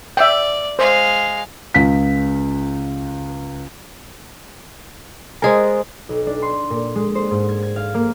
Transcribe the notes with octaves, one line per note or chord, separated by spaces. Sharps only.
D5 E5 G5
G#3 C5 F5
C#2 B6
G#3 G#4 A#4 C5 D#5 G#5
B1
D4
C6
A#2
G#3
C5
G#2
G#6
G#6
F5
A#3